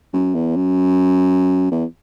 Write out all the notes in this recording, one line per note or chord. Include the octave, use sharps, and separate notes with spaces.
F#2
E2
F#2
E2